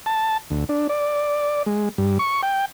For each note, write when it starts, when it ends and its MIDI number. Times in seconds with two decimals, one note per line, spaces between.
0.06 0.37 81
0.50 0.65 38
0.69 0.87 62
0.89 1.63 74
1.66 1.89 56
1.98 2.18 43
2.19 2.41 85
2.43 2.65 79